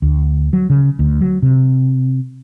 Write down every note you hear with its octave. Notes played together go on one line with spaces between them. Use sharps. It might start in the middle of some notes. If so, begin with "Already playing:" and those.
D2
F#3
C#3
D2
F#3
C3